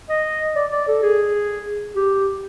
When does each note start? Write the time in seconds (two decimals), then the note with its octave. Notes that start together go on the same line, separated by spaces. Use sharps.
0.09 D#5
0.56 D5
0.72 D5
0.88 A4
1.03 G#4
1.96 G4